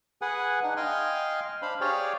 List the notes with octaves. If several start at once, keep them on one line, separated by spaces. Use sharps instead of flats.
G#4 B4 F#5 G#5
D4 D#4 F#5 G#5
D#5 F5 G5 G#5 C6
D4 C5 F5 B5
G4 G#4 C#5 D5 F5 G5